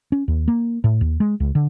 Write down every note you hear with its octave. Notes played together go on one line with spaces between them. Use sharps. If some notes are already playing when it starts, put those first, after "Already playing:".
C#4
D#2
A#3
A2
D#2
G#3
C#2
D3